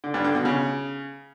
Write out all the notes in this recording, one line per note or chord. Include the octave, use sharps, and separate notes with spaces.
D3
G2
D3
B2
C#3